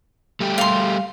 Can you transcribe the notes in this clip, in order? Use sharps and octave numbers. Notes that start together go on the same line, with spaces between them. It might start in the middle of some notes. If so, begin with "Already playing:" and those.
G3 A3 G4
F5 C6